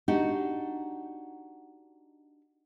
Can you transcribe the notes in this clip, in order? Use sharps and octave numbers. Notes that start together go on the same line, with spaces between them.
D4 D#4 F#4 G4